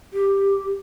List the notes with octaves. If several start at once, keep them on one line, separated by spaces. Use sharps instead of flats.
G4